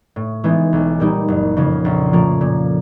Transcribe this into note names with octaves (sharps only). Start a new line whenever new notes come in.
A2
E3 G#3 B3 D#4
B1
A#2 G3 A#3 D#4
F#1
F2 C#3 F3
A#1
A2 F3 A#3
A#2